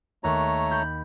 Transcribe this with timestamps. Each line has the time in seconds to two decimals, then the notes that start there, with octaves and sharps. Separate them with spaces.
0.24 D#2 A3 C#5 A#5 F#6
0.71 B5 G6